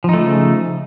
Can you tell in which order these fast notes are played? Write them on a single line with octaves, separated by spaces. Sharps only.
F3 D#4 A3 C#3